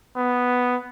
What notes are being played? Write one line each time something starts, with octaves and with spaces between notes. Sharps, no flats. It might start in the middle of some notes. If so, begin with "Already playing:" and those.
B3